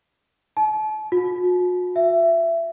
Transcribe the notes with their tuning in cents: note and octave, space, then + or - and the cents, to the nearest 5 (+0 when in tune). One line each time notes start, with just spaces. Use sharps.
A5 -40
F#4 -45
E5 +20